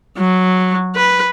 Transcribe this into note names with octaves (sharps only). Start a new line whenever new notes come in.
F#3
B4